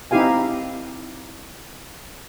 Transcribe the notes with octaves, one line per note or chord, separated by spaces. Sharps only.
C4 D#4 E4 G4 F5 G#5